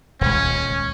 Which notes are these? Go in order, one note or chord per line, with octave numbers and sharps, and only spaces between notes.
D#1 C#2 C#4